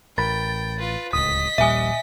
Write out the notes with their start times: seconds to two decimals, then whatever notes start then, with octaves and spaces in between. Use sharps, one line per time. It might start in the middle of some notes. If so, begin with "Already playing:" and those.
0.18 A1 A#4 G5 B5 A6
0.79 F4 B4
1.13 D1 C#2 D#5 D#6 B6
1.58 D#1 A#1 A#2 G3 E5 G#5 D#6